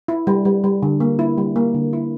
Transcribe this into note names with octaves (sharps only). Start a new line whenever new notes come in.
E4
G3
G3
G3
D3
A#3
E4
G3
A#3
D3
E4